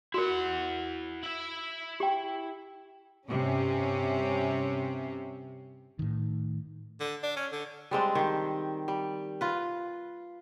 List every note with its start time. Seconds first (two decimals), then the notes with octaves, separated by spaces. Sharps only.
0.14 E4 F#4 A#4 F#5
1.23 E4 E5
2.00 G4 G5
3.29 G2 C3 C#4
5.99 A2 D#3
7.00 D3
7.23 D4
7.36 C#4
7.52 D3
7.91 G3 G#3 C4 D4
8.15 D#3 G4
8.88 G3
9.41 F4 B4